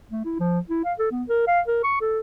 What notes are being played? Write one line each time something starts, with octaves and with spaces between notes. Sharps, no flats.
A3
E4
F3
E4
F5
A4
B3
A#4
F5
A#4
C#6
A4